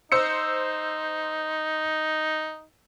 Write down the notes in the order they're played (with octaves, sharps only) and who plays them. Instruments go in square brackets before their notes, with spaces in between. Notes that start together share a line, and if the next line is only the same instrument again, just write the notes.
[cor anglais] D#4 [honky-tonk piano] C5 E6 C#7